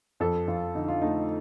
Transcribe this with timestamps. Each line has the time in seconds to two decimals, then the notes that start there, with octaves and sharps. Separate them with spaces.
0.20 F2 A4
0.47 F2 F4
0.75 D3 D#4
0.88 F4
1.02 A3 D#4